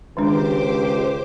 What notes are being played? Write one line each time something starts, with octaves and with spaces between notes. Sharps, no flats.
C#2 D#3 G#3 D4 G4 C5 D6